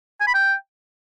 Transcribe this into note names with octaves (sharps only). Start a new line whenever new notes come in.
G#5
B5
G5